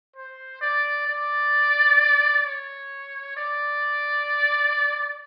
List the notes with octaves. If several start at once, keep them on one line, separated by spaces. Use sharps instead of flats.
C5
D5
D5
C#5
D5